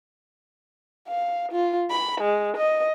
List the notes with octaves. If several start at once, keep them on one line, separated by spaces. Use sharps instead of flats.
F5
F4
B5
G#3
D#5